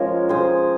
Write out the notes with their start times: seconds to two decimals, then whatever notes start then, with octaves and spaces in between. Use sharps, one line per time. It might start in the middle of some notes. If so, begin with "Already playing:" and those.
Already playing: F3 G#3 C#4 A#4 C#5
0.29 G#4 C5